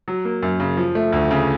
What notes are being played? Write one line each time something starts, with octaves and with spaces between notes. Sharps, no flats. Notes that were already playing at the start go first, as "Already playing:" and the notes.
F#3
A#3
F#2
C#3
F3
A3
D2
C#3